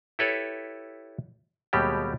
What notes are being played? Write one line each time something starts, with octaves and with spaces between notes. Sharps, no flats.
E4 G4 A4 B4 C#5
D#2 B2 G3 G#3 G4